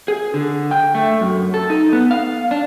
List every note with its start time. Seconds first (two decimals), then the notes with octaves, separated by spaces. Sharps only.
0.08 G#4
0.34 D3
0.71 G5
0.95 A3
1.21 F#2
1.54 A4
1.70 D#4
1.93 B3
2.11 F5
2.51 D4